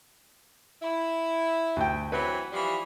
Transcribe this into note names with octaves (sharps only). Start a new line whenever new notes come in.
E4
D2 G5
E3 F#3 C4 B4
E3 F3 G3